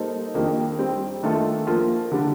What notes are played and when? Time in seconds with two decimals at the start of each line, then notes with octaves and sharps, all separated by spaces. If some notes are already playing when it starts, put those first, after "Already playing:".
Already playing: G3 A#3 D#4 A4 C5
0.34 F2 D#3 A#3 D4 G4
0.79 G3 C4 G4
1.23 D#3 A3 D4 F4 A4
1.67 F3 A#3 F4
2.12 D3 G3 D4